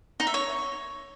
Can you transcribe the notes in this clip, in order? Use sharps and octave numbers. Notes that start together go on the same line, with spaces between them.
D#4
E5
C#5